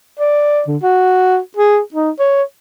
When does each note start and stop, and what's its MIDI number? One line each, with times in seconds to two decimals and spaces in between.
0.20 0.63 74
0.68 0.77 50
0.83 1.38 66
1.57 1.80 68
1.94 2.10 63
2.19 2.43 73